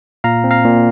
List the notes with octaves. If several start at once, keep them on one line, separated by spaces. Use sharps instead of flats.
A#2 F5 A#5
C4
F5 A#5
A#2